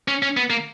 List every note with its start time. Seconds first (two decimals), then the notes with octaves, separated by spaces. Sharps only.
0.08 C#4
0.22 C#4
0.37 B3
0.50 A#3